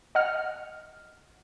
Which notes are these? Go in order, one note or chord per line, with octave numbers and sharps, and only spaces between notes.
D#5 F#5 F6